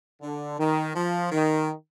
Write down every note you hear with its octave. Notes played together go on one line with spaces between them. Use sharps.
D3
D#3
F3
D#3